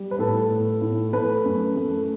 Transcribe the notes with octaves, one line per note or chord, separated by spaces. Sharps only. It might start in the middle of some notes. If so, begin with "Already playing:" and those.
Already playing: G3
B4
A2 A4
A2
A2
A3 B4
F#2
A3